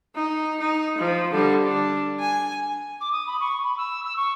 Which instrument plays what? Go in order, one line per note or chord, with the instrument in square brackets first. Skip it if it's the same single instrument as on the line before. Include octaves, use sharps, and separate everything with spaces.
[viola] D#4
D#4
F3
D3 G3
D4
G#5
[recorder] D6
D#6
B5
C#6
B5
E6
E6
C#6